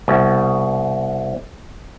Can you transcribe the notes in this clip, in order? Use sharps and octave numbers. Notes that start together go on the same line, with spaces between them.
C2 B2